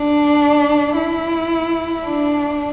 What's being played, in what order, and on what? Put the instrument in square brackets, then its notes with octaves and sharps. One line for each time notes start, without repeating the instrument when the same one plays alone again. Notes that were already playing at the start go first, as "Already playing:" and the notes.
Already playing: [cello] D4
E4
D4